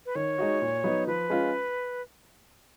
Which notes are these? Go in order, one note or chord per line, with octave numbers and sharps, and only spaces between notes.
B4
D#3 C#5
G#3 D#4 F#4
A#2
F#3 B3 D#4
F3 B4
G#3 C#4 F4